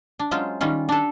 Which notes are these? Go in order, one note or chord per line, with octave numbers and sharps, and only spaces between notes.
D4
F#3 G#3 C#4 F4 C5
D#3 G3 C#4 F4
D4 A4